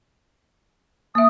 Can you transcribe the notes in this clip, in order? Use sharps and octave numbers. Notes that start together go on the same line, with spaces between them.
A#3 E5 D#6